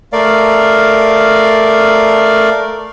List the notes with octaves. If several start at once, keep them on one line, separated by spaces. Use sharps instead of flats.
A3 A#4 D5 F5